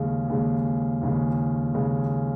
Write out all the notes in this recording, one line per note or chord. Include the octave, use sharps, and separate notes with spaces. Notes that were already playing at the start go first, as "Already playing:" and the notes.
Already playing: D#2 C#3 G#3
D#2 C#3 G#3
D#2 C#3 G#3
D#2 C#3 G#3